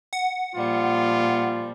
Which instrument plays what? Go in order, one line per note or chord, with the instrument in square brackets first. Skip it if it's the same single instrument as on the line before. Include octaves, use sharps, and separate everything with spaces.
[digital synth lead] F#5
[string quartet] A#2 F3 G3 [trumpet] F4